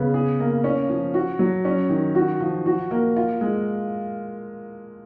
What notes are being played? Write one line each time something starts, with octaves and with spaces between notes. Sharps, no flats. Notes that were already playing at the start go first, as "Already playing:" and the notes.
Already playing: C#3 B3
G#4
A#3
C#4
F3
F#4
F#3
C#4
D#3
F#4
F3
F#4
A#3
F4
G#3